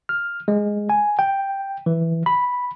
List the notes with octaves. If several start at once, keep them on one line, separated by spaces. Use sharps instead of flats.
F6
G#3
G#5
G5
E3
B5